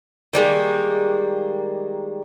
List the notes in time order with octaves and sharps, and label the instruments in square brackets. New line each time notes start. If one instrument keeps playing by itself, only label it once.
[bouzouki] D#3 G3 G#3 A#3